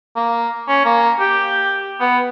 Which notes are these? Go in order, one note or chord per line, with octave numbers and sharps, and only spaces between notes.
A#3
C#4
A#3
G4
B3